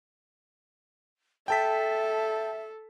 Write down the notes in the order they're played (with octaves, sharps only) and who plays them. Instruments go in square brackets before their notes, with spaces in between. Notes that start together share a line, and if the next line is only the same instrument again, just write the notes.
[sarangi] A4 [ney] E5 [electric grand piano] G5 A5 B6